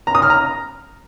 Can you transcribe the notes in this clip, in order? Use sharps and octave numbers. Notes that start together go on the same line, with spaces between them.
A#5
D#6
F6
A#5